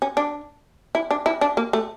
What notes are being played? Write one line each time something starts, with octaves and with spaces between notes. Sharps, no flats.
C#4
D4
E4
D4
E4
D4
A#3
A3